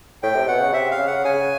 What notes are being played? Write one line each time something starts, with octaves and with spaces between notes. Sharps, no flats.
A2 G5
C3
B2 F#5
C#3
C3 E5
F5
C#3
F#5
C#3 G#5